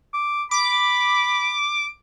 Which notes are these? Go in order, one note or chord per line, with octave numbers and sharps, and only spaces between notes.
D6
B5 D6